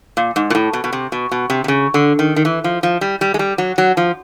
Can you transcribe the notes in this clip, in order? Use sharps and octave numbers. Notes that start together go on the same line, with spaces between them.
A#2
G#2
A#2
A2
B2
B2
C3
B2
B2
C3
C3
C#3
D3
D#3
D#3
E3
F3
F3
G3
G3
G#3
G3
F#3
F#3
F3